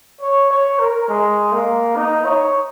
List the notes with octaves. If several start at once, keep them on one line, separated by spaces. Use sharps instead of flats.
C#5
C#5
A#4
G#3
A#3
D#4
C#5